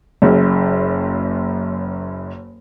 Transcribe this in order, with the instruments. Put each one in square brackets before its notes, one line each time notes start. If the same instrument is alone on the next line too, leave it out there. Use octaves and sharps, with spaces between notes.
[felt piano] F#1 F#2